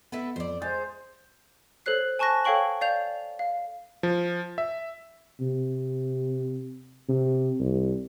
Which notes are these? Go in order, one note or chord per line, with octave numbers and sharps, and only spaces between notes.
B3 E4 A4 B4
F2 C5 D5
G#3 C5 G6 A6
A4 C5 C#5 F#6 C7
G#5 A5 C#6 F#6 A#6
A4 C#5 F5 G5 C#6 F#7
D5 F5 G6 F7
F5
F3
E5
C3
C3
C2